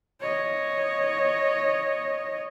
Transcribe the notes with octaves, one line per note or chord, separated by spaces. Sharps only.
C#5 D#5